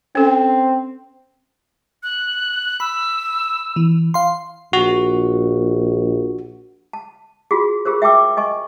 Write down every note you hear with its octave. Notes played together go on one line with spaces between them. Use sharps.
C4 C#4 A4
F#6
B5 E6
E3
F5 C6
A#1 F#4
A5
F4 F#4 G#4
F4 G4 G#4 A#4 C5
E5 G5 A5 D6 E6
D#5 G#5 C#6